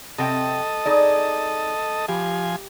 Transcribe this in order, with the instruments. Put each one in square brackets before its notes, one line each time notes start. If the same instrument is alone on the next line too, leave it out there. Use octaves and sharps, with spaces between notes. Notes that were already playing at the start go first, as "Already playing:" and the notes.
[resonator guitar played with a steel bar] C3 C4 G5 [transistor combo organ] A4 D#5
[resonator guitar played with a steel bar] D#4 G#4 D5
[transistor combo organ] F3 G#5 [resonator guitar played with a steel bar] G4